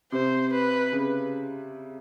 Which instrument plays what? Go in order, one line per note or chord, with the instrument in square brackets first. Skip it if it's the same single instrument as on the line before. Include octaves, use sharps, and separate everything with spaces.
[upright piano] C3 [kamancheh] C5
[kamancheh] B4
[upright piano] C#3